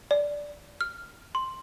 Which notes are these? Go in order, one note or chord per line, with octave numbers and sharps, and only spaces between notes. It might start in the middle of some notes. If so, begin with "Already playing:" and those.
D5
F6
C6